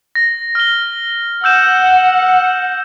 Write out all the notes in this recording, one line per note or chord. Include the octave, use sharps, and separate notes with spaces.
A#6
F6 G7
F#5 E6 G6 E7